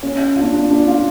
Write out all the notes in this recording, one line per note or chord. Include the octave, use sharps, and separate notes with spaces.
C#4
F4
D4
D4
D4
F4